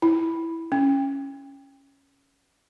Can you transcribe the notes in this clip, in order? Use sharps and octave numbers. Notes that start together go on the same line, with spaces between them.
E4
C#4